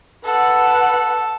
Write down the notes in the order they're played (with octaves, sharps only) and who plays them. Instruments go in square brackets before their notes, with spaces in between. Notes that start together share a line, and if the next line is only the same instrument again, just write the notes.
[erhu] A4 [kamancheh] B4 F#5